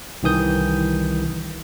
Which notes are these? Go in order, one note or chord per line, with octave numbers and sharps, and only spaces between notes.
C2 D#3 E3 D#6 G6